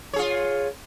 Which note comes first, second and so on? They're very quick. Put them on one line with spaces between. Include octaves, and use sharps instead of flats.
C#5 G#4 F4